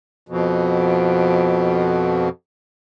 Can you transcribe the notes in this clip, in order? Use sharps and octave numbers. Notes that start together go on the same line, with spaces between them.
F2 B2